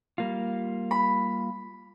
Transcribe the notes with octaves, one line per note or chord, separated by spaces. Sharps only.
G3 A#3 F4
B5